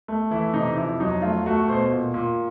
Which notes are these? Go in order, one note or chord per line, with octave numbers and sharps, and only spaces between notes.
A3
E3 E4
C3 D#4
F2 E4
F#3 D#4
A3 F4
A3 F#4
B2 C5
A#2
A#2